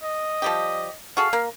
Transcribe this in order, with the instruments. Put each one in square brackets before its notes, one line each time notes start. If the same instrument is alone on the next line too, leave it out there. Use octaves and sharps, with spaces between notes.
[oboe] D#5
[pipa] F3 G3 G4
[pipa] F#4 G#4 A4 [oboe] F5
[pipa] A#3